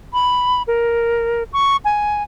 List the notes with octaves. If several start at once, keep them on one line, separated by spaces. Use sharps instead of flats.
B5
A#4
C#6
G#5